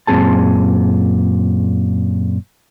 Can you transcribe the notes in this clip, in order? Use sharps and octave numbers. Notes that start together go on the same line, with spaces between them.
F#2 A#2 F3 C4 G#4 A5